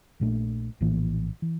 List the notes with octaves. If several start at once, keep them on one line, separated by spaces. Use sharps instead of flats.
A#1 A#2 A3 D4
A#1 A2 E3 A#3
E3